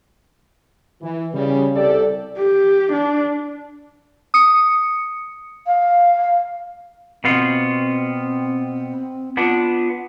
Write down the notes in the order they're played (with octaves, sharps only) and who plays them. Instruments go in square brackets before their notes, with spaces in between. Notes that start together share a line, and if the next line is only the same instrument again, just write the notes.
[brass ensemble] E3
C#3 G3
C2 G4 A4 D5
[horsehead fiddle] G4
D4
[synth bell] D#6 C#7
[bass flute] F5
[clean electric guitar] B2 B3 F4 [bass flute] C4
[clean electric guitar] B3 D4 [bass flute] F4